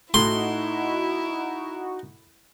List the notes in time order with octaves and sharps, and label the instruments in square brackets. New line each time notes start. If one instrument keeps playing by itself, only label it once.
[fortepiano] A2 [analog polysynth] D#4 F#4 [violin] E4 [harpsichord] C6